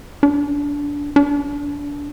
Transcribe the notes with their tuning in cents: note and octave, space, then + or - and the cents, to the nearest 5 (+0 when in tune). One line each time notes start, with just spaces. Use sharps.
D4 -20
D4 -25